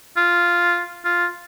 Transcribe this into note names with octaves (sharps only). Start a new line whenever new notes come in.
F4
F4